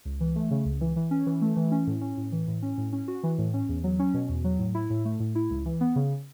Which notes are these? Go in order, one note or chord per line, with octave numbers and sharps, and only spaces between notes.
C#2
E3
A3
C#3
C#2
E3
E3
C#4
E3
A3
E3
C#4
A2
C#4
A2
E3
A2
C#4
A2
C#4
F#4
E3
A2
C#4
E2
F#3
C#4
B2
E2
F#3
A2
E4
A2
A3
A2
E4
C#2
E3
B3
C#3